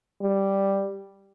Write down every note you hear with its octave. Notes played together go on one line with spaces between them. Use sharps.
G3